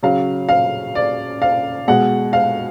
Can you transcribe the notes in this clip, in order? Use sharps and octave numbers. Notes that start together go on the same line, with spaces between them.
C#3 F#3 F5
F5
D5
F5
B2 G#3 F#5
F5